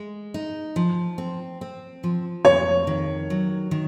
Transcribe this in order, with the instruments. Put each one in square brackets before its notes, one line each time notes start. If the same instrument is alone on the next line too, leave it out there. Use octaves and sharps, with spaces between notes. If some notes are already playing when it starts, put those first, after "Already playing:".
Already playing: [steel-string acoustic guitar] G#3
D#4
F3
C4
C4
F3
[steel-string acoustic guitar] F2 [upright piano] C#5
[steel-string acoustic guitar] D#3
F#3
D#3